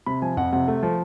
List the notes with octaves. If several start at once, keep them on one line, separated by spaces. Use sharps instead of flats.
C3 B5
F3 G#5
F2 F#5
C3 F#5
A3
F3